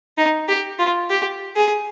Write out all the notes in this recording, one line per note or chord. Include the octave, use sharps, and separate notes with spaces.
D#4
G4
F4
G4
G#4